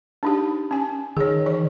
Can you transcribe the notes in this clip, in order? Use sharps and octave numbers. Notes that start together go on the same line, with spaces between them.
D4 D#4 G4
C#4 G#5
D#3 G#4 C#5
E3 D5